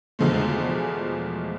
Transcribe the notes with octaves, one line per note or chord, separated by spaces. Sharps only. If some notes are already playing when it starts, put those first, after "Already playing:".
E2 B2 F3 G#3 A3